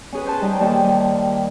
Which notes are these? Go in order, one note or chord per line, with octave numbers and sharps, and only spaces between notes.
C#4 G#4 B4
C5 A5
G3 D#4 G4
D#2 G3 A5